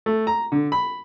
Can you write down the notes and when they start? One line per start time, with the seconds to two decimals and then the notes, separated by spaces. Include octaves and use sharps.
0.06 A3
0.27 A#5
0.52 D3
0.72 B5